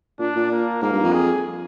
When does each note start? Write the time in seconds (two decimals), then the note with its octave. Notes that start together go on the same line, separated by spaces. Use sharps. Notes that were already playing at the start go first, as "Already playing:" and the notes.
0.19 A#2 D4
0.35 A#2
0.51 A#3
0.82 G#2 A#3
0.93 G2
1.03 F2
1.13 G#4